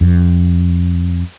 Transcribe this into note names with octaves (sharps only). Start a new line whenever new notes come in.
F2